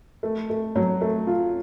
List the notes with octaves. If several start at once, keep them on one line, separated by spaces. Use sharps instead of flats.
A3
A3
F#3
A3
F4